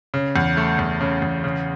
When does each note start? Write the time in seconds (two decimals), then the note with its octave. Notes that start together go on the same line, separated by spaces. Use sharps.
0.14 C#3
0.36 E2
0.57 A3
0.79 E2
1.01 C#3
1.22 E2
1.44 C#3